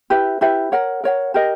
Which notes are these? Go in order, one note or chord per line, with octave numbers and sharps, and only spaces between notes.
E4 G4 B4 E5
E4 G4 B4 E5
A#4 C#5 F#5
A#4 C#5 F#5
G4 A#4 D#5